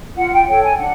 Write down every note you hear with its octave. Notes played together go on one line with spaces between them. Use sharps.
F4 F#5
G5
A4 C#5 G5
G#5
D4 F#5